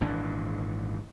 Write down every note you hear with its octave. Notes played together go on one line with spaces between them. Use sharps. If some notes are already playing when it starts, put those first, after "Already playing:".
G#1 A#2 E3 D4